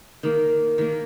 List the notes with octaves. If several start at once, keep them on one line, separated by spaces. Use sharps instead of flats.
D#3 A#3
D#3 A#3